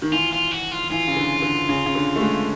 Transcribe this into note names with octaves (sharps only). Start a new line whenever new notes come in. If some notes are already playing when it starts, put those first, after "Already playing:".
D#3
E3 F4
F4
F#4
F4
E3 F4
C#3
D3
D3
C#3
C#3
D3
A3
G#3